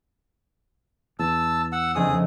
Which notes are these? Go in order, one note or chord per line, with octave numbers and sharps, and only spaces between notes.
E2 A5 E6
F#5 E6
F1 C#2 G#4 D#6